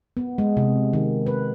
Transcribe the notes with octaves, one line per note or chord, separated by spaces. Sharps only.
B3
G#3
C3
D#3
B4